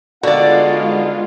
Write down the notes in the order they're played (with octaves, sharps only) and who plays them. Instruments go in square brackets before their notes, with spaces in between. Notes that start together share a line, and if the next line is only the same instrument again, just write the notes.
[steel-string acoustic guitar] D3 [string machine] G#3 F4 [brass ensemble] B3 D#4 F5 [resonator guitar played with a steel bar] F#4 D5